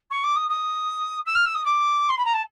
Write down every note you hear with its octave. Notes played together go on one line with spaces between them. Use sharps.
C#6
D6
D#6
D#6
E6
F6
E6
D#6
D6
C6
B5
A#5
A5